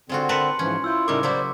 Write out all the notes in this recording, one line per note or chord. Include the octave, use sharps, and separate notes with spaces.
D3 G#3 C4 F4 F#4
A#4 B4 A5 C6 C#7
G#2 E3 F3 C#4
E4 F4 E6 G6
A2 C#3 G3 D#4 E4 A#4 D6
F#3 A#3 E4 C5 D5